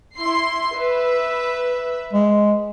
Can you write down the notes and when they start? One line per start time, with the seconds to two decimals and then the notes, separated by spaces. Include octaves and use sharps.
0.17 E4 C6 C7
0.75 B4 E5
2.13 G#3